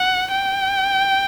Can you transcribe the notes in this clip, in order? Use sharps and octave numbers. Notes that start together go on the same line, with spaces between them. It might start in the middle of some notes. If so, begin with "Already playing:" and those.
Already playing: F#5
G5